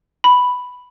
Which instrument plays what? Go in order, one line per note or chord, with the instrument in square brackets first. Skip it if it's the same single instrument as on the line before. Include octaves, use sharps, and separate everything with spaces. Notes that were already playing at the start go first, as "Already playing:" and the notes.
[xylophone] B5